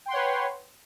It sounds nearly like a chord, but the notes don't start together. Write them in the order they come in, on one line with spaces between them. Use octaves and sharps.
G5 C6 F#5 C#5 B4